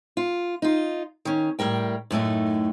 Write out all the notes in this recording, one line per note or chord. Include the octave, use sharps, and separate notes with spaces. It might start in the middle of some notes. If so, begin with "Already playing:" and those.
F4
D#4 F4
D#3 C#4
A2 G3 A#4 G5
F#2 A2 A3 D#4